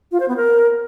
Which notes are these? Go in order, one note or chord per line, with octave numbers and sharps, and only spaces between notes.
F4
C5
B3
A#4